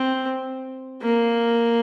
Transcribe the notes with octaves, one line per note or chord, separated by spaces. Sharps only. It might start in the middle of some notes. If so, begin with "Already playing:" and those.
Already playing: C4
A#3